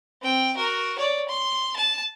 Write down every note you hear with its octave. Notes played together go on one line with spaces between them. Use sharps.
C4 G5
F#4 A#4
C#5 D5
C6
A5